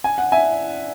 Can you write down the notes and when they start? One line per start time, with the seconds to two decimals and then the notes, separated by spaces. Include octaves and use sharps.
0.04 G#5
0.18 F#5
0.32 E5 G#5